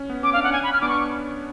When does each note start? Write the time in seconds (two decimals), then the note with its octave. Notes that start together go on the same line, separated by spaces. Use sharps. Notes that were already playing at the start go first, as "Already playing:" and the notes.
Already playing: C#4
0.10 B3
0.23 C#4 D6
0.33 D4 F5
0.43 F#5
0.46 C#4
0.52 G#5
0.63 B5
0.73 F6
0.81 B3 D4 D6
0.89 C#6